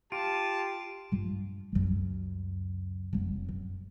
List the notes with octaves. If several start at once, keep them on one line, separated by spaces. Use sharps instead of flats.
F4 G4 A5 D7
G2 F4
C#2 F#2
F1 F#3
F#2